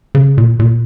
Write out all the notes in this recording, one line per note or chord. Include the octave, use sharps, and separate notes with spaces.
C#3
A#2
A#2